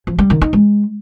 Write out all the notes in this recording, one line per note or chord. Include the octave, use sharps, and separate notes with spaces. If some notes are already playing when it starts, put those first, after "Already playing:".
F3
G3
D#3
D#4
G#3